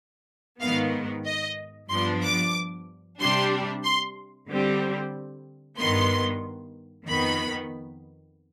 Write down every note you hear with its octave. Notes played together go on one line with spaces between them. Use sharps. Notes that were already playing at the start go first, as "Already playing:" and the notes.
G#2 D#3 B3 F5
D#5
G2 F3 B3 D4 C6
D6
C3 G3 D4 C6
C6
D3 G3 C4
G2 D#3 B3 C6
F2 D#3 B3 B5